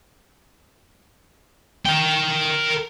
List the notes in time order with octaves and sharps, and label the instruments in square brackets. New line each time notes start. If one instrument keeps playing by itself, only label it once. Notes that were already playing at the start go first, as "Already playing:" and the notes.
[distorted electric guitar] A#4 G5